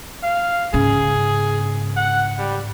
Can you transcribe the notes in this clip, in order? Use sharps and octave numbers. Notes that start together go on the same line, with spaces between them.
F5
G#2 C#3 G#4
F#5
G3